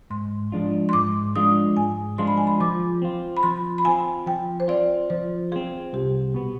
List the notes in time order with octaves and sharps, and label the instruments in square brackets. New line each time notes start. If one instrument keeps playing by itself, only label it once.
[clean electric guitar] G#2 [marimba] C6
[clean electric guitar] F3 G#3 D4 F4
[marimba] C6
[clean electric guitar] G#2 [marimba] D6
[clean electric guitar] F3 G#3 D4 F4 [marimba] D#6
[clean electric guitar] G#2 [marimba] G#5
[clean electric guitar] F3 G#3 D4 F4 [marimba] C6
[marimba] B5
G#5
B5
[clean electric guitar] F3 [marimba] D6
[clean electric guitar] C4 F4
[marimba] B5
[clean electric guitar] F3 [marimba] C6
[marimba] B5
[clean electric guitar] C4 F4 [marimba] G#5
[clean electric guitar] F3 [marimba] G5
[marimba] C5
[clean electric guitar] C4 F4 [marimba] D5
[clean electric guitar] F3 [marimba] C5
[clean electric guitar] C4 F4 [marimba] G#4
[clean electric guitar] C2 [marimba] G4
[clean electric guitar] B2 B3